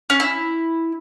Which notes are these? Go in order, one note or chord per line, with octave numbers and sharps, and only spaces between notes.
C#4
E4